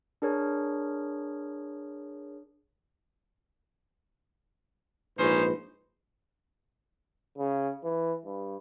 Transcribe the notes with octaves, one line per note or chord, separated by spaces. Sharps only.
D4 G#4 A#4 C#5
A#1 G#2 C#4 D#4 B4 C5
C#3
E3
G2